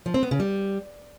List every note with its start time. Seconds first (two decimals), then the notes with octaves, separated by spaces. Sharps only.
0.06 F3
0.14 C4
0.23 B3
0.31 C#3
0.40 G3